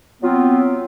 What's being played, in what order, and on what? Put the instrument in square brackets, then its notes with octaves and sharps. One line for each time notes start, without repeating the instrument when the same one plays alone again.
[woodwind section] F#3 B3 C4 F4